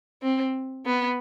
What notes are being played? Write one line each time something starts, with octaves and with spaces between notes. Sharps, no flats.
C4
B3